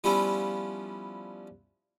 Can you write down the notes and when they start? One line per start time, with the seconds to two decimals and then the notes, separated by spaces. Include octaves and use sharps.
0.04 F3 G3 B3 C#4 E4